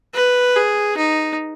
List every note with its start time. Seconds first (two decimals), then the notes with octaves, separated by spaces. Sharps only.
0.14 B4
0.56 G#4
0.97 D#4